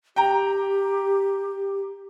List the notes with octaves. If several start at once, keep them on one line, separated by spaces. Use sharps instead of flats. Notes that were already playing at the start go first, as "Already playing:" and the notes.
G4 G5 A#5